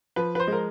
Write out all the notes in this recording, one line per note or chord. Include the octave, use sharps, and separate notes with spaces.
F3 B4
B4
C5
G#3 A#4